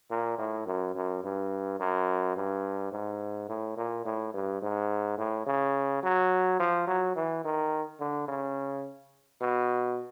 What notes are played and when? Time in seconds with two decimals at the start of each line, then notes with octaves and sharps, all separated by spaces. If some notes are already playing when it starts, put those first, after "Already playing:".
0.11 A#2
0.39 A2
0.66 F#2
0.95 F#2
1.24 G2
1.79 F#2
2.36 G2
2.92 G#2
3.49 A2
3.77 A#2
4.06 A2
4.34 G2
4.62 G#2
5.18 A2
5.47 C#3
6.03 F#3
6.59 F3
6.87 F#3
7.16 E3
7.45 D#3
8.00 D3
8.28 C#3
9.41 B2